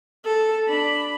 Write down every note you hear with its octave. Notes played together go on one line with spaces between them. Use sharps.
A4
D4 B5